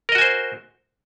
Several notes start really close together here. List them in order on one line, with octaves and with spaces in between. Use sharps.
A#4 D#5 F#4 G#5 C5